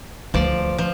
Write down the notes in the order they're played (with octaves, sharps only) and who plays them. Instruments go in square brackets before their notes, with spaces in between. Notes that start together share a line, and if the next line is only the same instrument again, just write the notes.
[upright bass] D2 [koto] F3 D5
[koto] F3